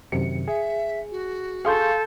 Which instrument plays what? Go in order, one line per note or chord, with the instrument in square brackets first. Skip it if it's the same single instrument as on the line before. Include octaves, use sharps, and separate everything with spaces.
[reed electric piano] F#2 C3 D#3 [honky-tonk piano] C#7
[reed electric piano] G#4 [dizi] E5
[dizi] F#4
[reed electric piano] G#4 C#6 [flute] A4 [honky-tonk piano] F5 C6 G6